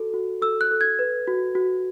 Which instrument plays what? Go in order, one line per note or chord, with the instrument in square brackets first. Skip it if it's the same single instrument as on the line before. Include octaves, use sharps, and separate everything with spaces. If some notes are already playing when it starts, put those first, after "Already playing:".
Already playing: [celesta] F#4 A4
F#4
A4 E6
F#6
A4
G#6
B4
F#4
F#4